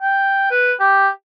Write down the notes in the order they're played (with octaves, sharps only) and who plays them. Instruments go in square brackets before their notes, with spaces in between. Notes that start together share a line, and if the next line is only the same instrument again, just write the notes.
[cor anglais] G5
B4
G4